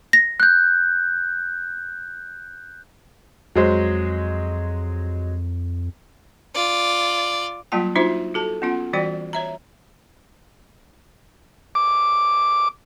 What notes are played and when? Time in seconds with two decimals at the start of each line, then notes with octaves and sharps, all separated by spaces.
0.13 A#6
0.40 F#6 G6
3.55 F2 F#3 G#3 C5
6.54 F4 D5
7.72 F#3 G3 A#3 F4 G5 A5
7.95 D4 D#4 F4 F#4 C5 E5
8.34 F#4 A4 A5
8.62 B3 C#4 F4 F#5
8.93 E3 G3 F#4 D5 G5
9.33 C#5 E5 A#5
11.75 D6